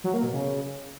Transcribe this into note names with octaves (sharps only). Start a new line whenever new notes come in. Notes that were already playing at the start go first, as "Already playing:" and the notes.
F#3
A#3
B2
C#3